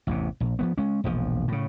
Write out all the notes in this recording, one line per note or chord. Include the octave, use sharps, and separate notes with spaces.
A1 E2 C3
A#1
F3 G#3 B3
G#3 C#4
E1 A#1 G#2 F3
A2 C#3